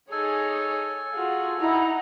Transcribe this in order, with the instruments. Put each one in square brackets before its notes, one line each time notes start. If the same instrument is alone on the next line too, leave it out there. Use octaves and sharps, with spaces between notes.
[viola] D#4 G#4 [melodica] A4 G#5 [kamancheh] C#5
[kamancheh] F4 F#4 [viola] G#4
[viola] D#4 [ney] E4 [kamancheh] F#5 A#5